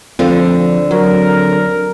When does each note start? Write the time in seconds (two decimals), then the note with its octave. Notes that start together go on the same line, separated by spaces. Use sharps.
0.19 D2 D3 F3 C4
0.91 F#3 A#4